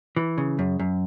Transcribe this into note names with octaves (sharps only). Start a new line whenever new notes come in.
E3
C#3
F#2
F#2